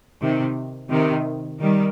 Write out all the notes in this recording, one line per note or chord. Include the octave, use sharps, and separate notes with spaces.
C3 D#3
C3 D#3
D#3 G3